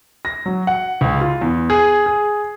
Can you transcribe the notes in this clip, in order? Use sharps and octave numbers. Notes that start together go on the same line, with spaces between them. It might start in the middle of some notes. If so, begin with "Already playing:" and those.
A#6
F#3
F#5
C#2
F4
E2
G#4
G#4